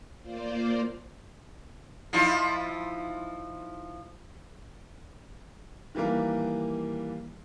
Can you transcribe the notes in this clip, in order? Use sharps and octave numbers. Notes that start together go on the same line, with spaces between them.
A#3 F4 C5 D5
F3 D#4 E4
D#3 E3 G3 A#3 A#4